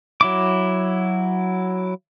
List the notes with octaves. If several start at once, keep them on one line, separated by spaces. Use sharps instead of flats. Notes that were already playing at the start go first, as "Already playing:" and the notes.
F#3 E4 D6